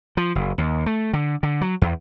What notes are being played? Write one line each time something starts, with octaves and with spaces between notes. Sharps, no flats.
F3
F#1
D#2
A3
D3
D3
F#3
E2